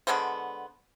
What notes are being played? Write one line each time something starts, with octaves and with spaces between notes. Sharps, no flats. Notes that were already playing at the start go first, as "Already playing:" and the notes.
D3 G#3 B3 C5